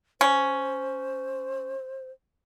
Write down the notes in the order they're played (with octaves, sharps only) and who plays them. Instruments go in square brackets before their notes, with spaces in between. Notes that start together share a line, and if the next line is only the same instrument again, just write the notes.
[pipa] C#4 [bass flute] C5